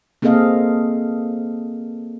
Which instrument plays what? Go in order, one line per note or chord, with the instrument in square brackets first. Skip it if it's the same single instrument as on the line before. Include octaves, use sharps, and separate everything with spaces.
[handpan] A#3 C4 G#4 A4 D#5 F5